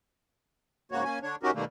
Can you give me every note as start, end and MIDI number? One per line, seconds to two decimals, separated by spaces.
0.92 1.04 44
0.92 1.04 49
0.92 1.04 58
0.92 1.04 66
0.92 1.04 73
1.04 1.19 58
1.04 1.19 61
1.04 1.19 80
1.22 1.36 50
1.22 1.36 62
1.22 1.36 73
1.43 1.51 61
1.43 1.51 63
1.43 1.51 66
1.43 1.51 67
1.43 1.51 70
1.55 1.65 47
1.55 1.65 51
1.55 1.65 55
1.55 1.65 57
1.55 1.65 58